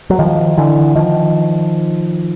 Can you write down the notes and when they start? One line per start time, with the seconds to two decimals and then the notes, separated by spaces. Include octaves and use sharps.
0.10 F#3
0.19 D#3 F3
0.58 D3 E3
0.95 D#3 F3